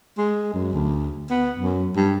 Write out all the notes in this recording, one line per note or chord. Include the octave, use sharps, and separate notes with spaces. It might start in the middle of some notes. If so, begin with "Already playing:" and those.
G#3
F#2
D2
B3
F#2
G2